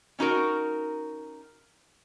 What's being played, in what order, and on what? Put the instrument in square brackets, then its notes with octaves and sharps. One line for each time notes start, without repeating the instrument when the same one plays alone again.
[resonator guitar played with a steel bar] C#4 D#4 F#4 A#4